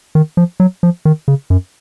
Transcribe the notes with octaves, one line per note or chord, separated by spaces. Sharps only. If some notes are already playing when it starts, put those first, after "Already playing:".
D#3
F3
F#3
F3
D#3
C#3
F#2